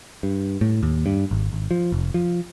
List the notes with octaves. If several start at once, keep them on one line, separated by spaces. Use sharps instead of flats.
G2
A2
D#2
G2
G#1
G#1
F3
F1
F3